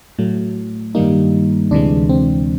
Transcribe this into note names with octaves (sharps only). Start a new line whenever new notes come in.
A2 F#3 A3
G2 D#3 G3 A#3 D#4
D2 C3 E3 G#3 D4
C4